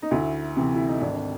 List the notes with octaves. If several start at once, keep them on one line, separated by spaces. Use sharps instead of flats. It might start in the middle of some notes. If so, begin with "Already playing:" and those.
D#4
D2 E4
C3 E3
E4
D#4
G#1 D4
D4